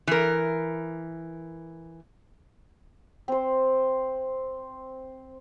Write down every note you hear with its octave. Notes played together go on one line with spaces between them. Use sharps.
E3 A#4
C4 C5